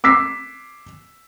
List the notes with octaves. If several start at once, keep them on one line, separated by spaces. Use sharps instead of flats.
D6 E6 B6 C7